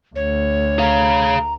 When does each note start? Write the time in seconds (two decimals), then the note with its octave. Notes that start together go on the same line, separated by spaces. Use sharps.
0.16 D2 C#5
0.79 G#4 F5 A#5